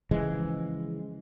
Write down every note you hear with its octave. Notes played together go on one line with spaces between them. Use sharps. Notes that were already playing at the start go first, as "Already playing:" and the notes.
C#3 E3 F3 G#3